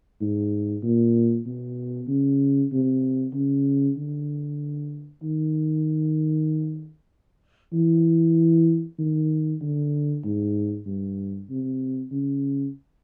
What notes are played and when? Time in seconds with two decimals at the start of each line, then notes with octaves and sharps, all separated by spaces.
0.21 G#2
0.83 A#2
1.46 B2
2.08 C#3
2.72 C3
3.34 C#3
3.97 D3
5.23 D#3
7.73 E3
8.99 D#3
9.62 D3
10.24 G#2
10.87 G2
11.50 C3
12.12 C#3